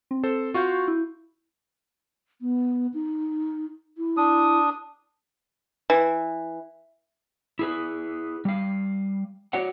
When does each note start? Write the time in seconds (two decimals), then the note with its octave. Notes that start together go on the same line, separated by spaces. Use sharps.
0.11 C4
0.24 A4 C5
0.54 F4 F#4 F5 C#6 G6
0.88 E4
2.41 B3
2.94 D#4
3.97 E4
4.17 D4 D#6
5.90 E3
7.59 E4 G#4 B4
8.45 G3 F5
9.53 F#4 C#5 D5 F#5